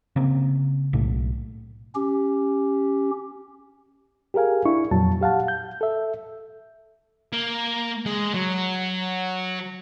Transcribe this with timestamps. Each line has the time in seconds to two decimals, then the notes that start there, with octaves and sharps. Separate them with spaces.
0.16 C#3 A#3 C4
0.93 B1 A2 A3
1.95 C#4 G4
4.34 G4 G#4 A#4 F5 G#5
4.65 D4 E4 C#6
4.91 F2 A#2 F#3 A5
5.21 G4 F5 F#5 A5
5.48 G6
5.81 A4 E5
7.33 A#3
8.06 G#3
8.34 F#3